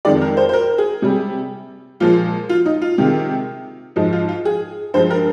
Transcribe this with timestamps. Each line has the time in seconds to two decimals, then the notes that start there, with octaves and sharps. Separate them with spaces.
0.05 F2 D#3 G#3 D5
0.21 A#4
0.37 C5
0.49 C5
0.53 A#4
0.78 G#4
1.02 C3 G3
2.00 A#2 F3 G#3 F4
2.49 F4
2.66 D#4
2.82 F4
2.98 C3 D#3 G#3
3.96 G#2 F3 G#3 D#4
4.13 F4
4.29 F4
4.45 G#4
4.94 G2 F3 G#3 C5
5.10 A#4